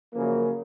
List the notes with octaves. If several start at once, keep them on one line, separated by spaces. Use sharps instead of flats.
F#2 C#3 F3 A#3